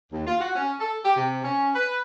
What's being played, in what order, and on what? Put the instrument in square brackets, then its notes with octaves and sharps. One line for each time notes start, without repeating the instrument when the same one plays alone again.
[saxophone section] D#2
F4
F#4
C#4
A4
G4
C3
C#4
B4